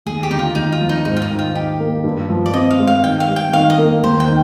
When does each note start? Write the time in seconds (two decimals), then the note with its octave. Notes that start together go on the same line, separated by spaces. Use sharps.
0.06 D#2 G#4
0.23 G4
0.30 D3 D#4
0.39 F4
0.55 D#2 D#4
0.72 F4
0.80 F3
0.89 D#4
1.05 G#2 D#4
1.17 F4
1.22 D#4
1.30 D#3
1.39 F4
1.54 D#4 G4
1.80 A#3
2.04 G2
2.30 F3
2.46 D5
2.54 C4 D#5
2.71 F5
2.79 G#3
2.87 F5
3.04 D#3 G5
3.20 F5
3.28 G3
3.36 G5
3.53 D#3 F5
3.70 D#5
3.78 A#3
4.03 D#2 C5
4.20 G5
4.28 D#3